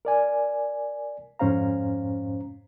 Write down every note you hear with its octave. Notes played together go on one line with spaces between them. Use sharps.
A#4 D5 G#5
F2 G#2 C#4 C5 F5 A#5